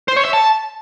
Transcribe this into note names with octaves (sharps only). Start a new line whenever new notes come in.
C5
C#5
E5
A5